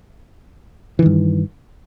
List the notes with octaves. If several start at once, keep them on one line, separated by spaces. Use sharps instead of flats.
G2 D#3 E3